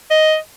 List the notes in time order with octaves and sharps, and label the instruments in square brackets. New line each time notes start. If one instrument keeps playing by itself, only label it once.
[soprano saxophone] D#5